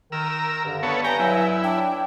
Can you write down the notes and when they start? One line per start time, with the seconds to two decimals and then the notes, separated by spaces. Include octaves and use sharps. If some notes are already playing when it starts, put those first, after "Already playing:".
0.12 D#3 A#4 E6
0.65 G2 D3
0.83 B3 A4 C#5
1.04 G5 G#5 A#5
1.20 F#3 E4
1.64 D4 G5